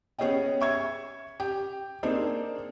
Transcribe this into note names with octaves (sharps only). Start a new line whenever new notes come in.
B3 C#4 G#4 C#5 D#5 G5
E5 C#6 G#6
G4
A#3 C4 D4 D#4 G#4 C5